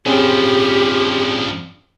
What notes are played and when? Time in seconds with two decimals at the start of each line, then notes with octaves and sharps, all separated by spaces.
0.06 G2 F3 C4 C#4 G4 G#4